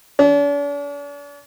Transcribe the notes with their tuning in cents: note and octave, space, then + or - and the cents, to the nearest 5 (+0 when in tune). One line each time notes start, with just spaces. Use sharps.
D4 -45